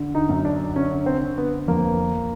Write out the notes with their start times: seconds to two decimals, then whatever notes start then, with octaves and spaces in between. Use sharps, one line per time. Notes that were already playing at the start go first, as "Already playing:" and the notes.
Already playing: D3
0.15 D#4
0.29 F#2
0.45 D4
0.76 D3 C#4
1.06 C4
1.22 D3
1.38 B3
1.68 F2 A#3